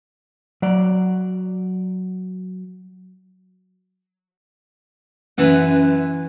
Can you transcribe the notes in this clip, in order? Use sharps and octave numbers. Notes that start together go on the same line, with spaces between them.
F#3 D5
F#2 E3 B4 F#5